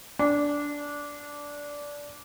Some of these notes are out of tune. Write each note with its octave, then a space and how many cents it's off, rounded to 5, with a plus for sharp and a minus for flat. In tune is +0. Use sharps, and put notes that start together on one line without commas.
D4 -15